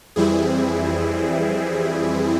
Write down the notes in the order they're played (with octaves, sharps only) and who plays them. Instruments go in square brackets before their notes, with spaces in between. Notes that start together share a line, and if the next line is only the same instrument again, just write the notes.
[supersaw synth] F2 E3 G3 C4 E4 G#4